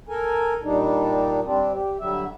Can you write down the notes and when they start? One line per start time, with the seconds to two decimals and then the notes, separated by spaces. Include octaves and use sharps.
0.09 A4 A#4 G#5
0.63 A#2 G3 D4 D#4
1.44 G3 C4 D4
1.73 G4
2.00 D3 F#3 G3 E5